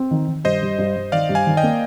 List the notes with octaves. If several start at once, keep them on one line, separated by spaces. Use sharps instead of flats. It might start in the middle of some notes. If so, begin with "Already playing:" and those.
Already playing: C4
D#3
D#3
G2 C5 D#5
G2
G2
G2
D#3 D5 F5
G2
F5 G#5
D#3
D#5 G5
A#3